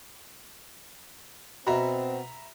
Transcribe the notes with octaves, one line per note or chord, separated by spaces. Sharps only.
B2 C4 E5 A#5 B5